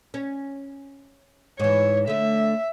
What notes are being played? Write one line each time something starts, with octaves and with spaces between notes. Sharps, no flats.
C#4
G#2 E3 C#5
D3 A3 E5